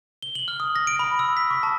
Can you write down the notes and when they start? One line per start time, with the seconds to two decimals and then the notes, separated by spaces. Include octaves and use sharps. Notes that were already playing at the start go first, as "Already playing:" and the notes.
0.22 G7
0.35 F#7
0.48 F6
0.60 D#6
0.76 A#6
0.87 D7
0.99 B5
1.19 E6
1.37 B6
1.50 C#6
1.63 A5